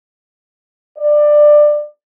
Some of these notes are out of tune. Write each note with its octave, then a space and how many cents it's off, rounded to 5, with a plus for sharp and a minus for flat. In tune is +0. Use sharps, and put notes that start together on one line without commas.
D5 +20